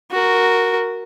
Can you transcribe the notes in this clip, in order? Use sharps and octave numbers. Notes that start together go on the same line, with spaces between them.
F#4 A#4